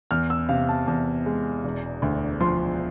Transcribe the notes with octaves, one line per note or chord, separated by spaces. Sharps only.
E2 F6
E6
C3 F5
A5
E2 A5
G#3
E1
D2
F3 C6